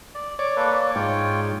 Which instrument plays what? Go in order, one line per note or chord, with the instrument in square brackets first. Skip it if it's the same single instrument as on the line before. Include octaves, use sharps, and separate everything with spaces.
[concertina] D5
[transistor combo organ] C#5 D5 [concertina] D6
[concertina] A#3 A4 B4
A#3
[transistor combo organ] G#2 [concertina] F4 C#5 G5